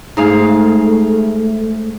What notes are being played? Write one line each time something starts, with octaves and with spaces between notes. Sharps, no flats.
G#2 A3 G#4 F5